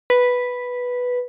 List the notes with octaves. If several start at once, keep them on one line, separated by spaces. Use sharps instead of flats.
B4